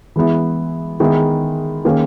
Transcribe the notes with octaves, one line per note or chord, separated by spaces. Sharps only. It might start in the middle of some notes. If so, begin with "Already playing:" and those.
E3 G#3 B3 E4
D#3 G#3 B3 E4 G#4
D#3 A#3 C#4 G#4